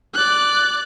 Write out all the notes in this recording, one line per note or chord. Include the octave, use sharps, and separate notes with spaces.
D5 F#6